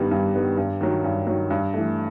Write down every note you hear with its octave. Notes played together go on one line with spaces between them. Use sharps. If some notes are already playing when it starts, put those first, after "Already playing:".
Already playing: G2 D#3 G3 B3
G2
D#3 G3 B3
G2
D#3 F#3
G2
D#3 F#3
G2
E3 A3